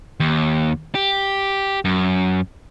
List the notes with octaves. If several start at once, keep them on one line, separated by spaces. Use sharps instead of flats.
D#2
G4
F#2